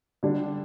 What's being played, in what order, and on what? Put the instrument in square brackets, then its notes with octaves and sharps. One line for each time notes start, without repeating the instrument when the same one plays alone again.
[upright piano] D3 G3 D4